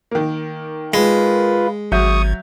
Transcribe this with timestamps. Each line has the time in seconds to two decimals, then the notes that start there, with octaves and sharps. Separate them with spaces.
0.11 D#3 A#3
0.94 G#3 F4 B4
1.92 G#1 F#3 E5 C#6 D#6 G6